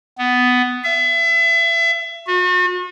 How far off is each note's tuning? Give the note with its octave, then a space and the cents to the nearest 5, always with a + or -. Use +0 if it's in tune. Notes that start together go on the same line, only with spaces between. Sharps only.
B3 +10
E5 +30
F#4 -40